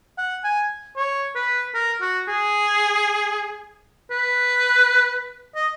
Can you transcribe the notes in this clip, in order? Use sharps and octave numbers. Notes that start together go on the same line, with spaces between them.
F#5
G#5
C#5
B4
A#4
F#4
G#4
B4
D#5